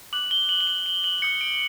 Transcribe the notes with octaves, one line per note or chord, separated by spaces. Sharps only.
D6 F#6 F#7
G7
F#7
G7
F#7
F#7
F#7
D#6 G6 C#7
D7